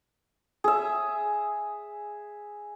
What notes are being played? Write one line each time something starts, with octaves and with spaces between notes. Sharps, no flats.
G#4 E5